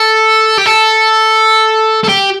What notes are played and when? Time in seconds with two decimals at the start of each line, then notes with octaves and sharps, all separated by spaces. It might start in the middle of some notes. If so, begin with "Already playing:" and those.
Already playing: A4
0.58 G4
0.66 A4
2.04 A4
2.09 G4